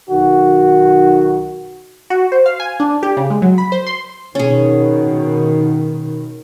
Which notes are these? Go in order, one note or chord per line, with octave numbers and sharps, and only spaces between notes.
B1 D#3 F#4
F#4
C5
F5
G#5
D4
G4
C#3
G#3
F#3
B5
C5
C6
B2 D#3 C#4 G#4